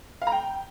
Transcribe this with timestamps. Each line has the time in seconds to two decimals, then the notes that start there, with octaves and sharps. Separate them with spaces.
0.22 F5
0.27 A#5
0.32 G5